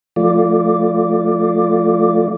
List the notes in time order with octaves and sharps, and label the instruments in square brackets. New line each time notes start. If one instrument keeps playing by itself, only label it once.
[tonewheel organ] F3 A3 F4 D5